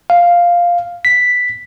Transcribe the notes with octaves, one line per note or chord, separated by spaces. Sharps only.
F5
B6